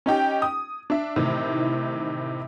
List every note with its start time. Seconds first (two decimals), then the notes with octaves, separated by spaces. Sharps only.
0.06 C#4 D#4 G4 G5
0.42 D#6
0.90 D4 E5
1.16 A2 C3 D#3 E3